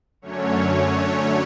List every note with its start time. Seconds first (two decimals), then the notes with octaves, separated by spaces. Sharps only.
0.21 F#2 D3 F#3 A3 C#4 C#5
0.57 C#5
0.94 C#5